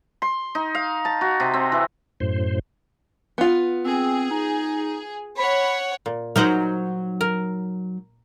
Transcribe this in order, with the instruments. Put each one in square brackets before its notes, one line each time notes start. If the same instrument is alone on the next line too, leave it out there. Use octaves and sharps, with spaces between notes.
[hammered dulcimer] C6
D#4
F5
A5
F#4
C3
C4
E3
[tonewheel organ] F#2 A2 C5
[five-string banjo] B3 F4
[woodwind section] C4 [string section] G#4
[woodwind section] D#4
[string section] C#5 F#5 [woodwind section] B5
[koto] A#2
[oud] F#3 D#4 C5 [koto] A#4 F#5
[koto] A#4